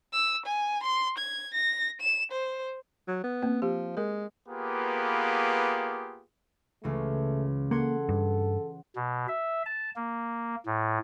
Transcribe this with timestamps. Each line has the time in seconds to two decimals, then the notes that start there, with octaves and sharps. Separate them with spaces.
0.13 E6
0.46 G#5
0.83 C6
1.18 G#6
1.54 A#6
2.01 E7
2.31 C5
3.08 F#3
3.24 B3
3.42 A#3 C4
3.62 F3 G4
3.97 G#3 A#4
4.48 A#3 B3 F4 G4 G#4 B4
6.83 C#2 C#3 E3 A3
7.71 A#3 A4 F#5 C6 G#6
8.09 G2
8.96 B2
9.28 E5
9.66 A5
9.96 A#3
10.66 A2